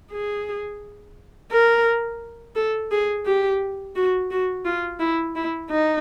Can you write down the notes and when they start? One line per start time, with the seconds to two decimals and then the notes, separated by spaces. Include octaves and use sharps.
0.12 G#4
1.51 A#4
2.55 A4
2.91 G#4
3.26 G4
3.96 F#4
4.31 F#4
4.65 F4
5.00 E4
5.36 E4
5.70 D#4